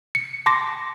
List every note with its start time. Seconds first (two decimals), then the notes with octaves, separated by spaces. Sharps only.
0.15 C#7
0.46 A5 C6 D6 A#6